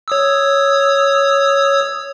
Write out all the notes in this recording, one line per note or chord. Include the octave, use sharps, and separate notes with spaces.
C#5 D#6 E6